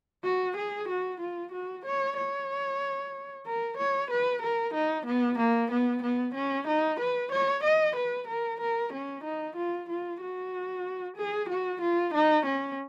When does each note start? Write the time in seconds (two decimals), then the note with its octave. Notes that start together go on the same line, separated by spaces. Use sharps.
0.24 F#4
0.57 G#4
0.89 F#4
1.21 F4
1.52 F#4
1.86 C#5
2.18 C#5
3.46 A#4
3.78 C#5
4.11 B4
4.42 A#4
4.74 D#4
5.06 B3
5.39 A#3
5.72 B3
6.03 B3
6.35 C#4
6.68 D#4
7.00 B4
7.32 C#5
7.64 D#5
7.96 B4
8.28 A#4
8.61 A#4
8.93 C#4
9.24 D#4
9.57 F4
9.90 F4
10.22 F#4
11.17 G#4
11.50 F#4
11.81 F4
12.14 D#4
12.46 C#4